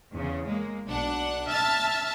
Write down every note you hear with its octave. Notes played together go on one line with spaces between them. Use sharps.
E2 C#3
G#3 A#3
B1 D4 F#5
E5 A5 F6 A6